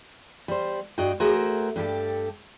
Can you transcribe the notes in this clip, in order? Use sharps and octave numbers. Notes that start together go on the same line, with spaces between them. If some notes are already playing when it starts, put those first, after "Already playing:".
G3 C5
G2 F#4 D#5 G5
A3 F#4 G#4 A#4 C5
G2 G4 A4